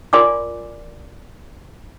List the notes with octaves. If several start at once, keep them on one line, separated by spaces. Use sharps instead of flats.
F4 A#4 D5 G#5 C6 D6